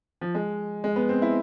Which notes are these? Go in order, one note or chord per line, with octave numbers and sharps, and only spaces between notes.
F3
G#3
G#3
B3
C4
E4